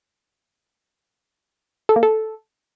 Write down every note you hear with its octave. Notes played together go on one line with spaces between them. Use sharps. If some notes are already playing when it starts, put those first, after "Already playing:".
A4
A#3
A4